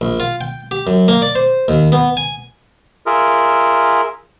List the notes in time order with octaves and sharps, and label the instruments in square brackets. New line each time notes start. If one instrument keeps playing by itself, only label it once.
[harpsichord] A#1
F4
G5
G4
F#2
A#3
D5
C5
D#2
B3
G#5
[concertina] F4 G#4 A#4 E5